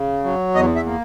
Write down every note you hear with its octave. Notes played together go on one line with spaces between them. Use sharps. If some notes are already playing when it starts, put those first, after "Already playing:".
Already playing: C#3
F#3
E2 D#5
E5
A#3